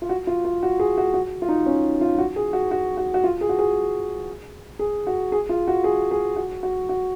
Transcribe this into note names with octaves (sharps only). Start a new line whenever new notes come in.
F4
F#4
F4
F4
F#4
G#4
F#4
F#4
F4
D#4
C#4
F4
F#4
G#4
F#4
F#4
F#4
F#4
F4
G#4
F#4
G#4
G#4
F#4
G#4
F4
F#4
G#4
G#4
F#4
F#4
F#4